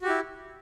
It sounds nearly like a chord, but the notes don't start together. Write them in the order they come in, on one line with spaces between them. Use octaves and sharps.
F#4 G4 E4